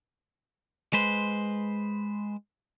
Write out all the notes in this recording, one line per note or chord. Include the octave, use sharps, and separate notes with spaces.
G#3 B4 C5